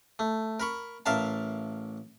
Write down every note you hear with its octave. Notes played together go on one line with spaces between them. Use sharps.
A3
A#4 B5 C#6
A1 A#4 E5 F5 A5